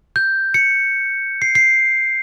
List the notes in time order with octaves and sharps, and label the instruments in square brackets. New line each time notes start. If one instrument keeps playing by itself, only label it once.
[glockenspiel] G6
C#7
C7
C7